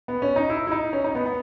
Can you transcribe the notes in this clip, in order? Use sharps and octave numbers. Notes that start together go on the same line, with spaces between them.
B3
C#4
D#4
E4
E4
D#4
C#4
D#4
B3
B3